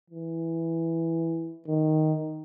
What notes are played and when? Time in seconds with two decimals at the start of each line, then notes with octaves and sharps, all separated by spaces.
0.10 E3
1.68 D#3